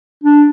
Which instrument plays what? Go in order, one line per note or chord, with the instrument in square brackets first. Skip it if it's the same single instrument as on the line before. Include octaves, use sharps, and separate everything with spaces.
[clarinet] D4